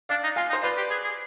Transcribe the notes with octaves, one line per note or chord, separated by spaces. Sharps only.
D4 D5 F5
D#4
F4 F5 G#5
D#4
C5
F4 B4 D5
G4
G#4
G#4